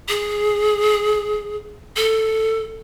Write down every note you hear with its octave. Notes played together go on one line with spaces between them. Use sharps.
G#4
A4